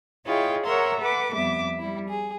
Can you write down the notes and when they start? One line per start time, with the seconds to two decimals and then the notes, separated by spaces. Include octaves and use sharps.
0.24 E4 F4 G#4 C#5 D#5 G5
0.64 A#4 C#5 E5 F#5 A#5 C6
1.00 A4 B4 F#5 D6
1.33 F2 G3 B3 E5 D6
1.79 G3 E4
2.08 G#4